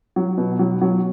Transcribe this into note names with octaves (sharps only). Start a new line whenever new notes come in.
F#3
B2
F#3
F#3